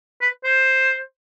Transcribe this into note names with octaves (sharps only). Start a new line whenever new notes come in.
B4
C5